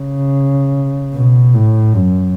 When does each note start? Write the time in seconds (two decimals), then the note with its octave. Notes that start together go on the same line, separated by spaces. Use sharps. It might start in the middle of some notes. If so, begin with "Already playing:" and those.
Already playing: C#3
1.14 B2
1.55 A2
1.96 F#2